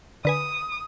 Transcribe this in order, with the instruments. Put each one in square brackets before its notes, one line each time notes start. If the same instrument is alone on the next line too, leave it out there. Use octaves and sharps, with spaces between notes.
[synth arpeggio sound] D3 B4 G#5 [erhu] D#6